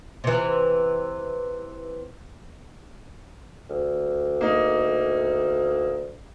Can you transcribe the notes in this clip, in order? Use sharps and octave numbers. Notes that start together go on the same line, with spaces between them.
C3 E3
D2
A#3 D#4